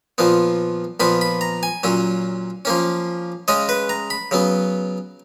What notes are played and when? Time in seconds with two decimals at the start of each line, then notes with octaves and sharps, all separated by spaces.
0.18 A#2 F3 B3
1.00 A#2 F3 B3 B5
1.21 B5
1.41 A#5
1.63 G#5
1.83 A#2 F#3 C#4
2.65 F3 A#3 C#4
3.48 C#3 G#3 C#4 D#5
3.69 B4
3.89 A#5
4.10 B5
4.31 C#3 F#3 B3